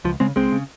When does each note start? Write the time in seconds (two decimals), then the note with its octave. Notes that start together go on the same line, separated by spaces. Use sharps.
0.05 C#2 F3
0.20 C#3 G#3 C4
0.36 C#2 G#3 C4
0.52 C#3